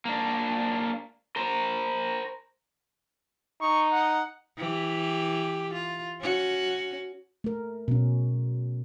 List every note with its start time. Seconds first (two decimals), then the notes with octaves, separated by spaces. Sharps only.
0.05 A#3 D4
1.36 A#4 C5
3.62 D#4 C#6
3.92 F#5
4.57 E3 G4
5.73 F4
6.21 C#4 F#4
7.44 A3 A#4
7.88 B2 C#4